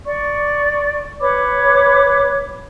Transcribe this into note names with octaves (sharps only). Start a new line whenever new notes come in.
D5 C#6
B4 C#5 B5 D6